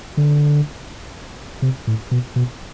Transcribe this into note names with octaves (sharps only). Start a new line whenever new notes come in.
D3
C3
A2
B2
B2